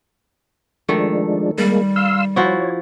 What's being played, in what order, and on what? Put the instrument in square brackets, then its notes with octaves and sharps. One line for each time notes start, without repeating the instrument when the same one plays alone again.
[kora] D#3 A3 [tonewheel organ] F3 G#3 D4
[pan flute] G3 [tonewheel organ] G#3 A#3
[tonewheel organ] F5 C6 E6
[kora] F3 E4 F#4 [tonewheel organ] C#5